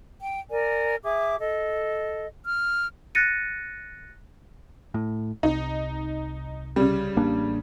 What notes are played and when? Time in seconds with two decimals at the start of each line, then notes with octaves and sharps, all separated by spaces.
0.20 G5
0.51 A#4 D5 G#5
1.04 G#4 E5 D6
1.39 A4 D#5
2.46 F6
3.15 F#6 A6 A#6 C#7 D#7
4.94 A2
5.43 C2 D#4
6.76 C#3 G3
7.16 A1 A#3 D4